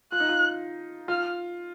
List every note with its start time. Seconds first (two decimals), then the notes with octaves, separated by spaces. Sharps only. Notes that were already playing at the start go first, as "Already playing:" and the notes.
0.12 F4 F#6
0.20 D#4
0.29 F4
1.08 F4 F6